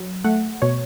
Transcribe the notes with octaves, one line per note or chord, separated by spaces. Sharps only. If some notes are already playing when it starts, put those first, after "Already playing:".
Already playing: F#3
A3 F#5
B2 C#5